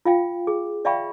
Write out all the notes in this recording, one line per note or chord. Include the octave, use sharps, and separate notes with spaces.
F4 F5 G5
G#4
D5 E5 F5 G5 B5 C#6